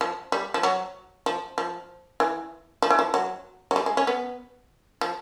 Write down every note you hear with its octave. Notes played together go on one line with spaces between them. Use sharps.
F3
G3
F3
F#3
F3
F3
E3
F3
E3
F3
F#3
F#3
G3
G#3
C#4
B3
F3